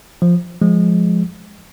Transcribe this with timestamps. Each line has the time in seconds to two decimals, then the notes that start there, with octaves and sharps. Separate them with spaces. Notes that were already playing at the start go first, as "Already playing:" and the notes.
0.22 F3
0.62 F3 G#3